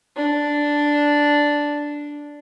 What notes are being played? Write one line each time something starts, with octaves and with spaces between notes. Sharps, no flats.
D4